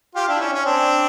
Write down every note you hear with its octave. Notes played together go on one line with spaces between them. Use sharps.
F4 G4
D4 E4
C#4
C#4
C4 D4